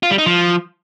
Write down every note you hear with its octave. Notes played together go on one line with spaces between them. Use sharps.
F4
G3
D#4
F3